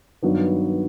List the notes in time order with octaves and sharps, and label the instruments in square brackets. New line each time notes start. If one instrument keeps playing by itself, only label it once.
[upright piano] G2 D#3 F#3 B3